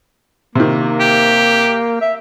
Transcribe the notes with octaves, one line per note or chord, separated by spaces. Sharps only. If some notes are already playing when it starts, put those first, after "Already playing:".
C3 D#3 A#3
G4
E5